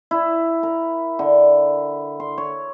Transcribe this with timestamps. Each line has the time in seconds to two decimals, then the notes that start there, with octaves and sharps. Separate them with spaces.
0.11 E4
0.63 A#4
1.19 D3
2.20 C6
2.38 C#5